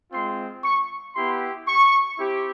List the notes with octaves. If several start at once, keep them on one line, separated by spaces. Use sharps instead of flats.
G#3 C4 F4 C6
C#6
B3 E4 G4 C6
C#6
C4 E4 G4